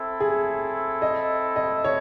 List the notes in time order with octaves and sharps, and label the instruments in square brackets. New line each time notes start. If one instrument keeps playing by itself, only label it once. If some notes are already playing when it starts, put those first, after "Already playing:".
Already playing: [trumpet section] C4 E4 A4
[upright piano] G#4
D#5
D#5
C#5